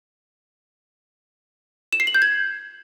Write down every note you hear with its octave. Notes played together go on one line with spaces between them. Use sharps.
E7
C7
F#7
G6
G#6